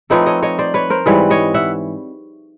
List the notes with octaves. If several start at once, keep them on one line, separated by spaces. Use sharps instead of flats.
F3 A3 C4 D#4 B4 C#5
C#5 D#5
C#5 D#5
C5 D5
B4 C#5
A#4 C5
G#2 E3 G3 C4 B4 C#5
C#5 D#5
E5 F#5